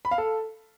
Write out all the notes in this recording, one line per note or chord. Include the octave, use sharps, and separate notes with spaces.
B5
F5
A4